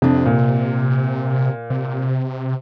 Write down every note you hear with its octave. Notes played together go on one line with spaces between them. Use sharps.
F2 C3 D4
A#2
C3